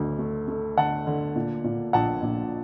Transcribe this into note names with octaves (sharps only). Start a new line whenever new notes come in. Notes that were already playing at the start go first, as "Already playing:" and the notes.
Already playing: D2 D3
A3
A3
D3 F#5 A5
D3
A#2
A#2
A#1 F#5 A5
A#1